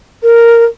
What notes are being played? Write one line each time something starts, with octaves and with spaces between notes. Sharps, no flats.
A#4